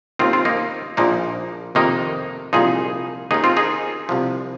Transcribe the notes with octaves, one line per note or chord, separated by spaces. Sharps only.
D#2 D#3 C4 F4
C4 F4
A#3 D#4
A#1 A#2 F3 A#3 D#4
F2 C3 D#3 A#3 D#4
C2 A#2 F3 D#4 G#4
D#2 D#3 D#4 G#4
C4 F4
D#4 G#4
C2 C3 F3